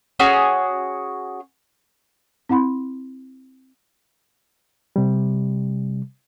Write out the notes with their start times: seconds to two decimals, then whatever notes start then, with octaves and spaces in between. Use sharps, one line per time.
0.20 C#4 F#4 G#4
2.49 C4 E4 F#5 B5 C6
4.96 C3 G3